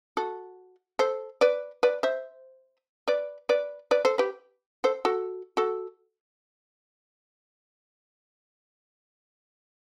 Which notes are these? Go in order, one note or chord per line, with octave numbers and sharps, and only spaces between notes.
F#4 A4
A4 C5
B4 D5
B4 D5
C5 E5
B4 D5
B4 D5
B4 D5
A4 C5
G4 B4
A4 C5
F#4 A4
F#4 A4